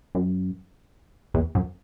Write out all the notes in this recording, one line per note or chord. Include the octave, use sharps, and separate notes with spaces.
F#2
E2
F#2